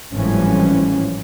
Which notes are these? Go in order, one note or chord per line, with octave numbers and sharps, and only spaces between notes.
G#1 A2 E3 F3 G3 C#4